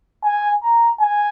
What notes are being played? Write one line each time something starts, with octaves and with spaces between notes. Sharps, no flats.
G#5
A#5
G#5